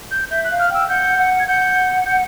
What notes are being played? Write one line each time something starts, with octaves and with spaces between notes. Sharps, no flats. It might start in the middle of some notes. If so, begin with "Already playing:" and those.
G6
E5 G6
F#6
F5
F6
G5
E6
F#5 G6
F#5
G#6
F#5 G6
G6